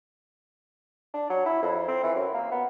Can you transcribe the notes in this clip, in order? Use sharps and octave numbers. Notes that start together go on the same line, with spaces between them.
D4
F#3
E4
F2
C4
E3
F#2
A#3
B3